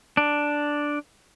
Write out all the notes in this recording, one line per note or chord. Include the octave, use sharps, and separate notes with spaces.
D4